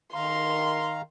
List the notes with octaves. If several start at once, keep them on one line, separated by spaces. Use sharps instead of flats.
D#3 F5 A#5 C6